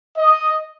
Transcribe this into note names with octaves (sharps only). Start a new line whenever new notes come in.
D#5